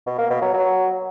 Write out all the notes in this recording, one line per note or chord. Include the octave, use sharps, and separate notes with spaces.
B2
A#3
B2
F#3
F#3